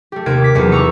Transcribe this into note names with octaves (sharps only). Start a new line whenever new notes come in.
A3 G4
D#2 C3 A#3 G#6 D7
D6 B6
F1 B1 E2 C#7
A#5 C#6 D6 E6 C#7